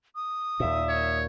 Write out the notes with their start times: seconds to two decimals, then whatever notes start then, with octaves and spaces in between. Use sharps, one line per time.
0.16 D#6
0.60 D#2 A#2 E5
0.89 C#5